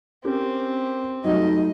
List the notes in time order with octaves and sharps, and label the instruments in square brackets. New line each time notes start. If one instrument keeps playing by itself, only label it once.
[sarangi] C4 [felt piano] C#4 G4 A#4
[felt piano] F#3 G3 A3 [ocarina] D#4 [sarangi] D#5